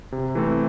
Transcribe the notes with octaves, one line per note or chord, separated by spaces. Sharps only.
C3
E3 A3 C4